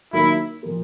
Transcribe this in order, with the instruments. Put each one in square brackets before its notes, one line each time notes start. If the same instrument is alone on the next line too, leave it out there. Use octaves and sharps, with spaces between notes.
[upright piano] D#3 F#3 A#3 D#4 [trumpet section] E4
[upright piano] A#2 F3 A#3